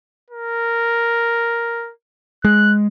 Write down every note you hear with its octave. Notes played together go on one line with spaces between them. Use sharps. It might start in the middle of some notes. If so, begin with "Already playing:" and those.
A#4
G#3 F#6